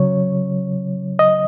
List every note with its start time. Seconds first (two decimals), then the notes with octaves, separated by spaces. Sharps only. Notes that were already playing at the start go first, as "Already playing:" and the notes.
Already playing: C#3 F#3 C#5
1.19 D#5